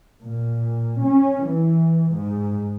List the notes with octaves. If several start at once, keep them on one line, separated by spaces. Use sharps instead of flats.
A#2
C#4
E3
G#2